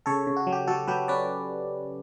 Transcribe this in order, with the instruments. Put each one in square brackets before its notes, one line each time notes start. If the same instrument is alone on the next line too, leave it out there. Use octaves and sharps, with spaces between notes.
[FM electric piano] C#3 A4 C#5
C#3
F#4
F#3
G4
F#3 F#4 A4
F#3 G4 B4
C#4 B4 D5